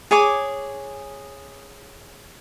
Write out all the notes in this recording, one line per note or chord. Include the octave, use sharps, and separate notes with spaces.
G#4 C#5 G#5 D6